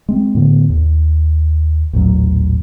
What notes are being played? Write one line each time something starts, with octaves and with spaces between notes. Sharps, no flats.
G#3 C4
A2 D3 B3
D#2
A1 D#2 A#2 F#3